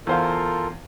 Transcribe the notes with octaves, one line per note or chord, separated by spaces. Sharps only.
E2 F4 A4 A#4 C5 F5